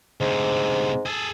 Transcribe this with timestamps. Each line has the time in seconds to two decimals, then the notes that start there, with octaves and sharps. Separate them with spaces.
0.21 D2 G#2 C3
1.06 G#4 A4